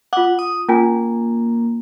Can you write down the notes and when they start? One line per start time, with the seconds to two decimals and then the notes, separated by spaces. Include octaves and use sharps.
0.13 F4 F#5 D6
0.39 D#6
0.69 A#3 C#4 F4 G#5